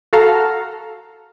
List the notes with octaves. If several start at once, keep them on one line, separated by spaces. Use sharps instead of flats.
F#4 A4 F5 A#5